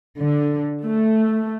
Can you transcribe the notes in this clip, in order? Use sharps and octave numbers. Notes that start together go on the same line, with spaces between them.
D3
A3